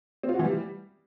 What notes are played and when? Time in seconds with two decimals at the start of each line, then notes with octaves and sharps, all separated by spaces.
0.23 C4
0.29 F4
0.34 F#4
0.39 E3
0.45 G3